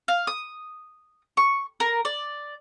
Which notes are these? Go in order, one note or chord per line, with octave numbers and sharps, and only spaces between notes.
F5
D#6
C#6
A#4
D5